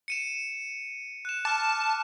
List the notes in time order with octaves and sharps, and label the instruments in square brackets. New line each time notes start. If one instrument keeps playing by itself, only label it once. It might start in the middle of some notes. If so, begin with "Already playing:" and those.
[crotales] C#7 D#7 E7
F#6 E7
[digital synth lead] A5 [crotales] D6 F6 E7